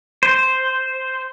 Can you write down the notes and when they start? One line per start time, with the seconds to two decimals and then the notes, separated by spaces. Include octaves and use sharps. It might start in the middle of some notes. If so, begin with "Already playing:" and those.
0.23 C5